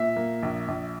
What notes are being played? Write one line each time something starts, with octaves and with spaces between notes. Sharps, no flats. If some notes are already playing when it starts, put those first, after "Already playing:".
Already playing: A#2 E5
A#3
A#1
A#1